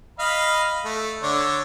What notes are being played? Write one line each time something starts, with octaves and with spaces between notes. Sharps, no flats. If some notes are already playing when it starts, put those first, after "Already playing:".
D#5 F5 B5
A3
D3 D4 C#5